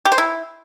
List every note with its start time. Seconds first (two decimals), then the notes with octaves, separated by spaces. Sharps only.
0.05 G4
0.12 C5
0.18 E4